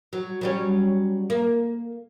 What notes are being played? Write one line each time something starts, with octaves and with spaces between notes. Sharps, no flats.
F#3
F#3 G3 C#4
A#3